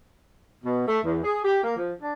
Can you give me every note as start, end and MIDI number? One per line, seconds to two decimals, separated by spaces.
0.64 0.86 47
0.87 0.99 57
1.04 1.20 40
1.23 1.40 68
1.44 1.60 67
1.63 1.74 58
1.76 1.92 53
2.00 2.12 62